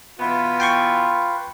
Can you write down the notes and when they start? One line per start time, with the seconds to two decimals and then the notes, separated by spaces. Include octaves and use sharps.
0.19 B2 E3 B3 F4 B4
0.60 G5 C6 C#6